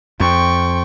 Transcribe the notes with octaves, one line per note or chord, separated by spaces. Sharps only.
F2 G5 C#6